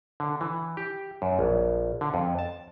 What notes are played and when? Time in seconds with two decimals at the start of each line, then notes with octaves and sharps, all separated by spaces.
0.20 D3
0.41 E3
0.77 G4
1.22 F#2
1.39 A#1
2.01 D3
2.14 F2
2.39 A5